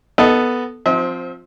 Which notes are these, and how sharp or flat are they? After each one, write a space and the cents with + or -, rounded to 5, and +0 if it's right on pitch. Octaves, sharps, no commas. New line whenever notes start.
B3 +0 A4 +0 D#5 +0
F3 +15 C4 +0 E5 -45